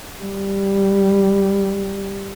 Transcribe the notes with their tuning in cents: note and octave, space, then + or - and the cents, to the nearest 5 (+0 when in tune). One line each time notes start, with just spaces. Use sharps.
G3 +5